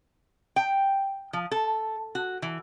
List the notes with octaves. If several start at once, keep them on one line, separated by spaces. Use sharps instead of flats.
G5
F3
A4
F#4
E3